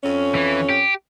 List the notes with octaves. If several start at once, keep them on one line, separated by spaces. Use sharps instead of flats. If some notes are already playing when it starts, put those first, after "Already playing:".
F2 C#4
E3
G4